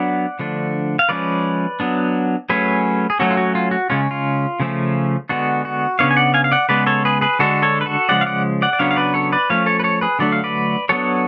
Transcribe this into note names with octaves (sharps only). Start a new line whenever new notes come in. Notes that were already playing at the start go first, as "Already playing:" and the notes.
Already playing: F#3 B3 D4 D5 F#5
D3 F3 A3 D4
F5
F3 G#3 C#4 B4 D5
F#3 B3 D4
F#3 A3 C#4 G#4 B4
G#4
F#3 A3 C#4 F#4 A4
F4
F#4
F4
F#4
C#3 G#3 C#4 F4
F4
C#3 F3 A3 C#4
D3 G#3 B3 D4 F#4
F#4
C#3 F3 B3 D4 C#5 F5
G#5
D5 F#5
F5 G#5
F5
D5 F#5
C#3 G#3 B3 B4 D5
A4 C#5
G#4 B4
G#4 B4
D3 G#3 D4 F#4 A4
A4 C#5
B4
F#4 A4
C#3 F3 G#3 D5 F#5
F5
D5 F#5
D5 F#5
D5
C#3 F#3 B3 D4 C#5 F5
F5
B4 D5
A4 C#5
B4 D5
F3 A3 C#4 C#5 F5
A4 C#5
B4
A4 C#5
G#4 B4
D3 F#3 A3 D4 D5
F5
B4 D5
F#3 B3 D4 A4 C#5